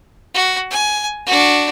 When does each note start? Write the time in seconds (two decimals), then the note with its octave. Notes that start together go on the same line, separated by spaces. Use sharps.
0.34 F#4
0.71 G#5
1.26 D4 F#4